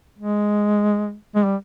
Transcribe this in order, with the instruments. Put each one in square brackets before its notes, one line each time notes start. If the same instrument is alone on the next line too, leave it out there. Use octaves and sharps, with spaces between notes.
[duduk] G#3
G#3
G3